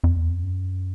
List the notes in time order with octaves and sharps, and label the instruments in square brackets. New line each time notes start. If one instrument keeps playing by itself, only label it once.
[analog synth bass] F2
E2
F2
F#2